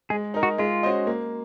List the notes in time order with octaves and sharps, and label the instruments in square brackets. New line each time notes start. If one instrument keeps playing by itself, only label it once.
[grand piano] G#3 [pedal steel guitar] G#4
[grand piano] D#4 A#4
[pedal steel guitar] F#4
[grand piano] G#3 [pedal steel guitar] F4
[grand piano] C#4 F#4 C5 D#5
A#3